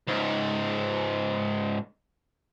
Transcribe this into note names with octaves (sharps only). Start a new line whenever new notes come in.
C#2 G#2